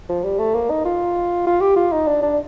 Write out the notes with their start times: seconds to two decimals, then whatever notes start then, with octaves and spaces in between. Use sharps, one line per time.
0.09 F3
0.24 G3
0.39 A3
0.54 A#3
0.70 D#4
0.85 F4
1.46 F4
1.61 G4
1.76 F4
1.92 D#4
2.07 D4
2.22 D4